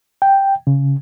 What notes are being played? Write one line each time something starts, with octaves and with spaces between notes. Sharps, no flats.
G5
C#3